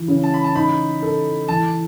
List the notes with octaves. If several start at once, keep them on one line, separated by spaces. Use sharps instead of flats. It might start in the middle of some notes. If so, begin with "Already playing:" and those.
Already playing: E3
C#3
A5
B5
A5
D#4 B5
A4
E3 A5